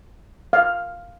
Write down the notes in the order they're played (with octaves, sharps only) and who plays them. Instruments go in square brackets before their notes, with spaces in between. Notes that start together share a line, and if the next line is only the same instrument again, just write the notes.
[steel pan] F5